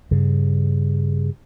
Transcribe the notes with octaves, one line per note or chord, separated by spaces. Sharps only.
G2 C#3